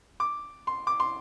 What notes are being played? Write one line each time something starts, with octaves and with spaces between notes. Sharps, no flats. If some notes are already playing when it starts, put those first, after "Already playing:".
D6
C6
D6
C6